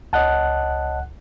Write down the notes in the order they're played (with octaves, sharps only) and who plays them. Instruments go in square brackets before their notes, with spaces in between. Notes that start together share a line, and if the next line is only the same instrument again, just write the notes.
[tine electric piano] C#2 F#5 F#6 [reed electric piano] C#5 D#5 A5